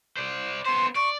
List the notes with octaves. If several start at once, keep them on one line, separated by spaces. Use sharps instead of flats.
C5 D5
B3 C5 C6
D5 C#6